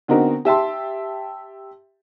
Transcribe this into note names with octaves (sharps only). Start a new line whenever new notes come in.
D3 B3 C4 D#4 F#4 A#4
G4 E5 A5 C6